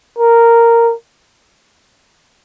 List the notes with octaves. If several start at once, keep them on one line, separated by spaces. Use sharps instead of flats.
A#4